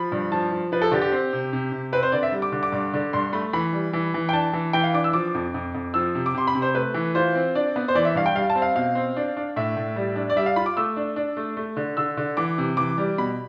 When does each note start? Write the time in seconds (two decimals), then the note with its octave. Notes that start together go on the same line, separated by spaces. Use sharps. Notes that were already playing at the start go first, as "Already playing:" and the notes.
Already playing: F3 B5
0.12 G2
0.32 F3 A5
0.51 F3
0.72 F3 B4
0.82 A4
0.92 D3 G4
1.02 G4
1.12 C4
1.33 C3
1.53 C3
1.72 C3
1.92 C4 B4
2.03 C5
2.12 D3 D5
2.23 E5
2.32 G3
2.42 D6
2.52 D3
2.63 D6
2.72 G2
2.94 D3
3.13 G2 C6
3.33 A3 B5
3.53 E3 B5
3.73 G3
3.93 E3
4.14 E3
4.29 G5
4.33 D4 A5
4.53 E3
4.73 E3 G5
4.84 F5
4.94 D4 D6
5.04 E6
5.13 F3 D6
5.35 F2
5.54 F2
5.75 F2
5.94 F3 E6
6.15 C3
6.26 D6
6.34 C3 C6
6.47 B5
6.55 C3
6.62 C5
6.75 A3 B4
6.94 E3
7.15 F4 C5
7.35 C4
7.55 D4 D5
7.76 B3
7.88 C5
7.95 E3 D5
8.05 E5
8.15 G2 F5
8.26 G5
8.35 G3 F5
8.50 A5
8.55 C4
8.62 F5
8.75 B2 F5
8.95 C4
9.17 D4
9.37 D4
9.56 A2 E5
9.77 A2
9.96 G3
10.16 D4
10.30 D5
10.36 G3 E5
10.46 F5
10.56 F4 B5
10.66 D6
10.77 A3 E6
10.97 D4
11.16 D4
11.37 A3
11.57 A3
11.77 D3
11.97 D3 E6
12.17 D3
12.37 E3 D6
12.58 C3
12.77 E3 D6
12.98 G3
13.18 B2 B5